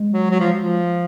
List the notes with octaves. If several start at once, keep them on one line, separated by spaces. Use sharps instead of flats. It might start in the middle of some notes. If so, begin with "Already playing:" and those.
Already playing: G#3
F#3
F#3
F3
F3